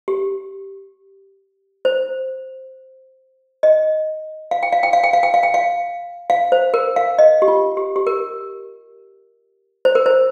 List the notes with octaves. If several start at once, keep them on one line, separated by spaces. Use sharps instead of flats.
G4
C5
D#5
F5
G5
F5
G5
F5
G5
F5
G5
F5
G5
F5
F5
C5
A#4
F5
D#5
G4
F4
G4
G4
A#4
C5
A#4
C5